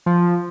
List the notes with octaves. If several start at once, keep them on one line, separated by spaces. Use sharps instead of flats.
F3